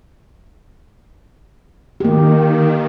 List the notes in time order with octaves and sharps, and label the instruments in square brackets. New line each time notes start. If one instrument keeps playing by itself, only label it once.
[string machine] D#3 [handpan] A#3 G4